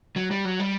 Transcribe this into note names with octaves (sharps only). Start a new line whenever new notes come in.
F#3
G3
F#3
G3